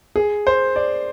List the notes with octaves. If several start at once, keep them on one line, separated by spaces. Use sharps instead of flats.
G#4
C5
D5